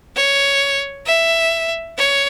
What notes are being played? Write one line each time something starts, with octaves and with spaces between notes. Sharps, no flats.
C#5
E5
C#5